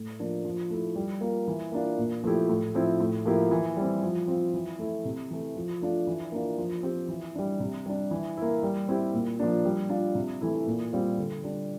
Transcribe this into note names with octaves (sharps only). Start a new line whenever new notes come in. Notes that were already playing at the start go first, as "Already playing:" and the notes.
Already playing: A2
F3 A#3 D4
F3
A3 E4
G3
A#3 F4
E3
A#3 D4 F4
A#2
F3 A3 E4 G4
A2
F3 C4 E4
A2
F3 A#3 E4 G4
E3
G3 C4
F3
C4 F4
E3
A3 E4
C3
E3 A3
F3
A3 D4 F4
E3
A#3 D4 F4
F3
C4 G4
E3
G3 D4
C3
G3 D4
E3
A#3 E4
G3
C4 E4 G4
A#2
F3 A#3 D4
G3
D4 F4
C3
E3 A3 E4
A#2
G3 C4 F4
D3
G3 D4